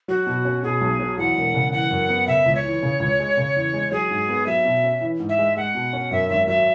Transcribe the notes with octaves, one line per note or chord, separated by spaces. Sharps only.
F#3 F#4
B2
C#4
B2 G#4
B1
F#3
E2 F#5
E1
C#3
E3 F#5
F#2
B3
C#3 E5
C#2
C#5
E3
C#3
C#2
G#3
C#3
E2
G#3
F#3 G#4
G#2
B3
F#3 E5
B2
C#4
E3
G#2
E5
G#3
G#3 F#5
B2
C#4
F#2 E5
G#1 E5
F#3 E5